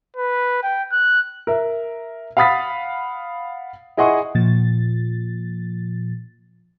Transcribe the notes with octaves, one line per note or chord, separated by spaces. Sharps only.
B4
G5
F#6
A#4 E5
F5 F#5 B5 D#6 A6 B6
E4 G#4 D#5 F#5 C6 C#6
A#2 F3 A6